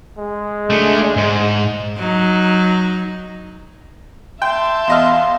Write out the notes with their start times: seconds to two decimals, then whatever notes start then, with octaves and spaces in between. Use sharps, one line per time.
0.18 G#3
0.70 A3 D4
1.17 G#2
1.97 F#3 D#4
4.42 E5 G5 A5 C6
4.88 E2 D#5 F5 F6